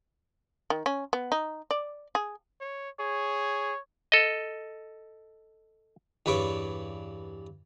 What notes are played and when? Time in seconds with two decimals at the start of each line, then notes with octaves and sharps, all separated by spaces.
0.70 D#3
0.86 C#4
1.13 B3
1.32 D#4
1.71 D5
2.15 G#4
2.61 C#5
3.00 G#4 C#5
4.12 A4 D#5
6.26 E2 G2 B4 C#5 D5 D6